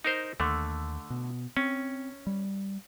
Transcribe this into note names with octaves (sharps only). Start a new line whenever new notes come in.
D#4 A#4 C5
D#2 D3 A3
B2
C4 C#4
G3